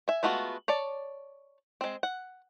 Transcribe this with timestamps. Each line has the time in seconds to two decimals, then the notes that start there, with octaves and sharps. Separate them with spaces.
0.08 E5 G#5
0.23 G#3 A3 B3 F4 F#4
0.68 C#5 D5 A5
1.81 G#3 C4
2.03 F#5